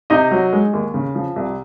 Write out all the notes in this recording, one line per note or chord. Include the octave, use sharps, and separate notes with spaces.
C3 D#4 D#5
F#3
G#3
D#2
C#3
F3
C2